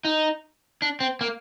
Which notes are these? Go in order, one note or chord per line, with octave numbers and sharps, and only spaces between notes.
D#4
D4
C4
A#3